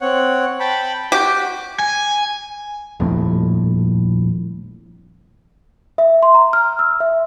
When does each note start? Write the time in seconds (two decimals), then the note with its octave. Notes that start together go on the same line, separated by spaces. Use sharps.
0.01 C4 C#5 F#5
0.60 G5 A5 B5
1.12 F#4 G4
1.79 G#5
3.00 D#1 A#1 F2 A2
5.98 E5
6.23 C6
6.35 A#5
6.53 F6
6.79 E6
7.00 E5